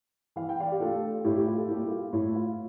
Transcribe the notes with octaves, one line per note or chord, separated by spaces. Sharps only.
E3 F5
G5
D5 F5
G4
A3 D4 F4 A4
A2 E4 G4
G4
F4
A4
G3 A#3 E4 G4
F4
A2 E4
F4